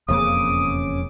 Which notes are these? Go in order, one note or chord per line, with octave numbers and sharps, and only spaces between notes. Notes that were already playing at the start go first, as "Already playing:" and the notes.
E1 F2 C#3 A#3 D6 D#6